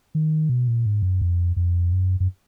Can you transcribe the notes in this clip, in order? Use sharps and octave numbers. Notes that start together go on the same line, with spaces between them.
D#3
B2
A#2
G#2
F#2
F2
F2
F#2
F#2